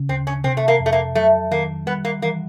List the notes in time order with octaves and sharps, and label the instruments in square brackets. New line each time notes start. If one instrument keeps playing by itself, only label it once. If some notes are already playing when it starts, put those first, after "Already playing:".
Already playing: [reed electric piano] C#3
[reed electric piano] D2 [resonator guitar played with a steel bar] C4
[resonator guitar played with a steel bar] C#4
[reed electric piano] C3 [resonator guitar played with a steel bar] C4
[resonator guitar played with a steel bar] A3
A#3
[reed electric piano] F2
[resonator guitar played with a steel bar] A3
A#3
[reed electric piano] F#3 [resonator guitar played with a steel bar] A3
[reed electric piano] D#3 [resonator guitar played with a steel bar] A#3
[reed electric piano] G3 [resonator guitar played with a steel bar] B3
[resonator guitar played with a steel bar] A#3
[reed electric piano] E3 [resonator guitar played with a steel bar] A#3